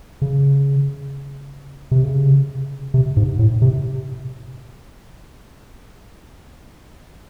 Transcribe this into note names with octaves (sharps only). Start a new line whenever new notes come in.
C#3
C3
C#3
C3
G#2
A2
C3